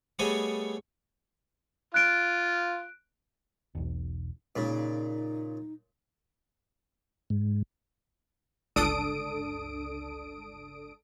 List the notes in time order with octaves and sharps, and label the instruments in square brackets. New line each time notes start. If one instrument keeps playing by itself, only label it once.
[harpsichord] G3 A3 B3 G#4 C#5 D#5
[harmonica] F4 [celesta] F#6 D7
[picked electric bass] E1 B1
[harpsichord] A#2 C#3 [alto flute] D#4
[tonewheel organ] G#2
[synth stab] G1 C#2 D4 A4 D#6 D7